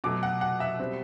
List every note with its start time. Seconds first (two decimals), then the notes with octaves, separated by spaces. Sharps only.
0.04 B2 F#3 A3 D6
0.23 F#5
0.41 F#5
0.60 E5
0.79 B2 G3 C4